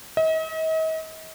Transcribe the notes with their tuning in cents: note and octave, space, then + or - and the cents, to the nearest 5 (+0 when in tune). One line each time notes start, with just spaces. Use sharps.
D#5 +40